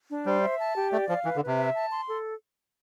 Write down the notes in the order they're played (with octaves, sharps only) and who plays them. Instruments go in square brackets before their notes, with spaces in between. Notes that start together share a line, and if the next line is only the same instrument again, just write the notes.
[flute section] D4
[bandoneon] G3 [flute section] C5
[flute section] E5
A5
G4
[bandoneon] A3 [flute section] D5
[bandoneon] F3 [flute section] F5
[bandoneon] E3 [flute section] B4
[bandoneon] D3
[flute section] B4
[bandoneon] C3
[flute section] E5
A5
C6
A4